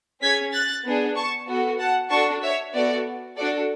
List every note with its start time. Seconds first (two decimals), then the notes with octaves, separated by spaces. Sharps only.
0.22 C#4 G#4 G#6 B6
0.53 F#6 A6
0.84 B3 D4 G#4
1.16 A5 C#6
1.47 B3 F#4 A4
1.79 F#5 A5
2.10 D4 F#4 A4 A5 C#6
2.41 C#5 E5
2.73 B3 F#4 A4 D5
3.36 D4 F#4 A4 D5